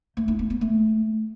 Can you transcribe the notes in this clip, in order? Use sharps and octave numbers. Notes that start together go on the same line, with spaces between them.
A3
E4
B3
B3
A3